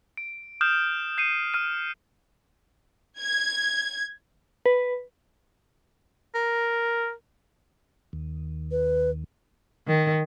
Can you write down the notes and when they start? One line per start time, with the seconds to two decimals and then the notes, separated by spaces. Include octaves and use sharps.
0.17 D7
0.61 D#6 F6 G6 E7
1.18 G6 C7 C#7 D#7
1.54 F6 D#7
3.19 G#6
4.66 B4
6.35 A#4
8.13 D#2
8.71 B4
9.87 D#3